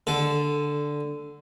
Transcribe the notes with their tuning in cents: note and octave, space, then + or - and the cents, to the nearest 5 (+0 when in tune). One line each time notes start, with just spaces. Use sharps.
D3 +0 A4 -15